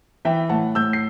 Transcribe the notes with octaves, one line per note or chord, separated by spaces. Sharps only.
E3 E5 G5
A2 F#5 A5
A2 E6 G6
C7